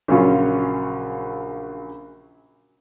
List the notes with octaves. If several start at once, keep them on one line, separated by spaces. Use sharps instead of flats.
A#1 C#3 F#3 C#4 F4